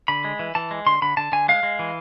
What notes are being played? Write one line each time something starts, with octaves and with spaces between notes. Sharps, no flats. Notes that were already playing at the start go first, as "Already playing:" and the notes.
D3 B5
G#3
E3
E3 A5
G#3
D3 C6
D3 B5
D3 A5
D3 G#5
G#3 F5
G#3
E3